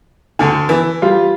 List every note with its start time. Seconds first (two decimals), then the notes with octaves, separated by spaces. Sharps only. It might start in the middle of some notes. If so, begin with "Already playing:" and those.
0.39 D2 D3 G#5
0.69 E3
1.02 G3 F4